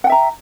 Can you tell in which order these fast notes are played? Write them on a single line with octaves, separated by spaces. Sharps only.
F#5 G5 E5 A#5